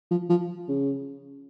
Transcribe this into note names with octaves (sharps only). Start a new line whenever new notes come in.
F3
F3
C#3